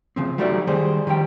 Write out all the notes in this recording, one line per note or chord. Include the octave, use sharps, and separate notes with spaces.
C#3 F3 C4
F#3 G3 A3 D#4 F#4 D5
D#3 G3 G#4 C5
D#3 F3 G3 G5